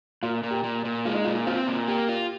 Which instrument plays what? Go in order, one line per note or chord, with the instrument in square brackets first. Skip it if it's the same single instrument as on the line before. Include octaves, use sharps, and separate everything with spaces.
[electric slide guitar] A#2 [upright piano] F4
[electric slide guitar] A#2
[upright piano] G4
[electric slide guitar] A#2
A#2
[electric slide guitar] G#3 [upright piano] F4
[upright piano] D#4
[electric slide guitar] A#2 [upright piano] F4
[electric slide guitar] C4 [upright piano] F4
[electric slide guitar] A#2
[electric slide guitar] A#3 [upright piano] G4
[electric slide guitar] F4